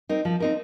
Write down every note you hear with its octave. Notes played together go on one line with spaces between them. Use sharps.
C4 D#4 A#4
F3
C4 D#4 A#4